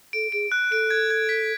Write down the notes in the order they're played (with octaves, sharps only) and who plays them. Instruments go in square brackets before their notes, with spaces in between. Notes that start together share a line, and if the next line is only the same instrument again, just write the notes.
[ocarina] A4 [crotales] D7
[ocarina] G#4 [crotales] D7
[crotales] F#6
[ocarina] A4 [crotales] D7
[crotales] G#6
G#6
B6